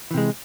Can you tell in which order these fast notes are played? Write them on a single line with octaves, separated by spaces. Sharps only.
E3 C3 G#3